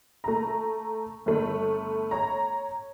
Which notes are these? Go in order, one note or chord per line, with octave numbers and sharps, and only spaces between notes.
A3 A#5
G1 A3
C#5 A#5